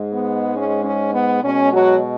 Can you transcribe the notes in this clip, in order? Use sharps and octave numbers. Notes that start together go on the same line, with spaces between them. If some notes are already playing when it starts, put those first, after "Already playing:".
Already playing: G#2 G#3
B3
C#4
C#4
B3
B2 G#3 C#4
F#3 F#4